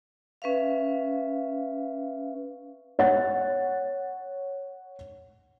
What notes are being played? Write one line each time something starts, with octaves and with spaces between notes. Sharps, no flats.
C#4 B4 E5 F5
C#5 F#5 A6